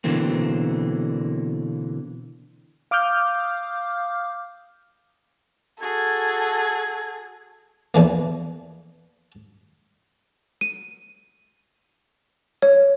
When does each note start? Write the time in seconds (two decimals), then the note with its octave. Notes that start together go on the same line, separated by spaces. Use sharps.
0.04 B2 D3 E3 A#3 C4
2.91 F5 D6 D#6 F6 G6
5.81 F#4 G#4 A4 G#6
7.94 A#1 E2 E3 A#3
10.61 D#7
12.62 C#5